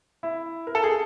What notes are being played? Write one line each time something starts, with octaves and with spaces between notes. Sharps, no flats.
E4
A#4
A4
G#4